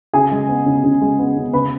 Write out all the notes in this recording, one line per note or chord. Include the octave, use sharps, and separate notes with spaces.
C#3 G#4 G#5
G#3
B3
C#3
C#3
G#3
B3
C#3
C#3 B4 B5